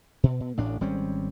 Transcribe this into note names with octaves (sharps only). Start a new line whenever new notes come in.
B2
B2
A1 A2 D4
G#1 G3 C4 C#4